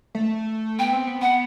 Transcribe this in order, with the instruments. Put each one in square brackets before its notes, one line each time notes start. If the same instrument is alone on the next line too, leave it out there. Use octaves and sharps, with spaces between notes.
[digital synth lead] A3
[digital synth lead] B3 [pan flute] G5
[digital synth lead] C4
B3
[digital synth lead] B3 [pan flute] F#5